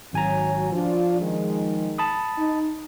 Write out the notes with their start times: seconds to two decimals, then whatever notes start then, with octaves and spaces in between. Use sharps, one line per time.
0.13 G#1 F#3 G#5 A#5
0.72 F3 D4 F4
1.20 D#3 G#3
1.98 A5 B5 D#6
2.37 D#4